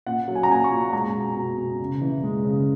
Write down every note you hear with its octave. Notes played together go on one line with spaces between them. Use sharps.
A#2 F#5
F#3
G#5
A#5
A#2 G#5
C#6
A#2
G#3 A#5
B2
B2
B2
C#3
E3
G#3
C#3